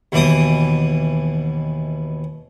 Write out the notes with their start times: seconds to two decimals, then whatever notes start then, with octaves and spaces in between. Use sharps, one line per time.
0.12 D#2 B2 E3 D6 D#6